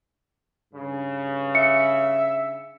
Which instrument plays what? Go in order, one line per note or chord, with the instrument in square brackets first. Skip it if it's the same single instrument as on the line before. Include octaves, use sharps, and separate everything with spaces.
[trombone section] G2 C#3
[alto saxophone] E5 [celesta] C#7